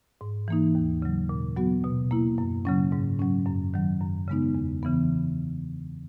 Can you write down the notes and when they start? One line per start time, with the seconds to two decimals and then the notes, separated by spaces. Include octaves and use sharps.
0.21 G#2
0.48 E3 A#3 D#4
0.75 D#2
1.02 C#3 F#3
1.29 A#2
1.56 F#3 B3 F#4
1.84 B2
2.11 A#3 E4
2.38 F#2
2.65 C#3 F#3 C#4
2.92 G#2
3.19 F#3 C#4
3.47 F#2
3.74 D#3 F#3
4.01 F#2
4.28 C#3 G#3 B3 D#4
4.55 E2
4.83 C#3 E3 B3